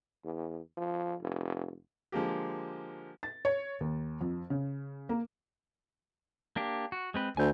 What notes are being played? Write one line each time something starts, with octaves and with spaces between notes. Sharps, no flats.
E2
F3
F1
D3 F3 G#3 A#3 G4
A6
C#5
D#2
F2
C#3
A#3
A#3 D4 G4
F#4
G#3 C4 B4
D2 G#5 G6